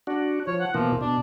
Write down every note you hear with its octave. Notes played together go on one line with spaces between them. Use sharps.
D4 F#4
F3 C#5
F#5
B2 E3 F3 A#3
B2 D4